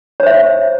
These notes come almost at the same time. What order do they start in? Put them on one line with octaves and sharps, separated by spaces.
C#5 C5 E5